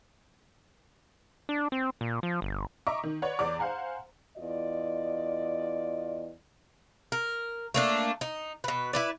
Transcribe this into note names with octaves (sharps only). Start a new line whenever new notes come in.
D4
C4
A#2
F3
G1
D#5 E5 A#5 C#6 D6
D#3
B4 C#5 D5 F#5
E2 D5 D6
C5 F5 F#5 G#5 A#5
E2 F4 D5 D#5
A#4
A3 A#3 D4
D#4
B2 B4
E4 B4 D5